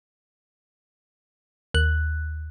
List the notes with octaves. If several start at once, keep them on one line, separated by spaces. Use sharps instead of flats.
D#2 F#6